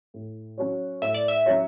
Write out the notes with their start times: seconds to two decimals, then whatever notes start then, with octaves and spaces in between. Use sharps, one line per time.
0.14 A2
0.58 F#3 C#4 F#4 C#5
1.02 A2 E5
1.14 D5
1.28 E5
1.46 F#3 C#4 F#4 C#5